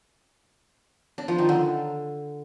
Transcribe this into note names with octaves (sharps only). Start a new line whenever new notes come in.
D4
F3
D#3
D3